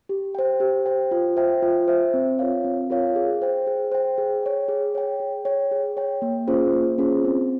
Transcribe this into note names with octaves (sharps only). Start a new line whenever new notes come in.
G4
C5 G5
G4
C5 G5
F4
C5 E5 G5
F4
C5 E5 G5
C4
F4 A#4 C#5 F5
C4
F4 A#4 C#5 F5
G#4
C5 G5
G#4
C5 G5
G#4
C#5 G5
G#4
C#5 G5
G#4
C#5 G5
G#4
C#5 G5
A#3
C#4 F4 G#4 C5
A#3
C#4 F4 G#4 C5
C4